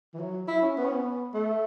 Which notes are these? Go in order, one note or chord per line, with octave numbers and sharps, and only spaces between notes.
E3
F#3
E4
C#4
B3
C#4
B3
A3